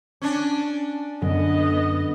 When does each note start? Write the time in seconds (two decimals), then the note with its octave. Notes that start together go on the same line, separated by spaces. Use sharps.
0.22 C#4 D4
1.22 F#2 D3 B3 D#5